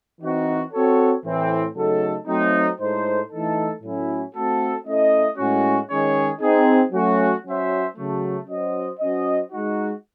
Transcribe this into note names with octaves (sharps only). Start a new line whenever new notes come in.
E3 C4 D#4 F#4
C4 F#4 A4 C#5
A2 E3 C4
C#3 F#3 A3 D#4 A4
F#3 A3 C4 D#4
A2 G#3 D#4 A4 C5
E3 A3 D#4 A4
A2 F#3 C#4 E4
A3 C4 F#4 A4
A3 C#4 E4 A4 D#5
A2 G#3 C#4 F#4
D#3 G#3 C#4 G#4 C#5
C4 D#4 G#4
F#3 A3 C#4 F#4
F#3 C#4 F#4 C5 E5
C#3 F#3 A3
F#3 C#4 F#4 C5 D#5
F#3 C#4 F#4 C5 D#5
G#3 D#4 F#4